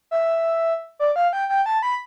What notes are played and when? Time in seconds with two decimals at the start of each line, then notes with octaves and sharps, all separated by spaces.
0.11 E5
0.99 D5
1.16 F5
1.33 G5
1.49 G5
1.66 A5
1.83 B5